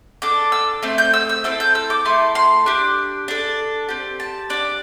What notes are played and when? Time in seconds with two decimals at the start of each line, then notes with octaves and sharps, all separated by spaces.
0.22 D4 A4 D6
0.52 E6
0.83 A3 C4
0.98 G6
1.13 E6
1.29 E6
1.44 C4 E4 A4 E6
1.60 G6
1.75 E6
1.90 D6
2.05 A3 E4 A4 C6
2.35 C6
2.66 D4 G4
3.28 D4 A4
3.89 C4 G4
4.20 A5
4.50 D4 G4 D5